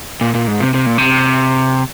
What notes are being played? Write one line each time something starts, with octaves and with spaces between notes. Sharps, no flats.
A#2
A#2
G#2
C3
C3
A#2
C3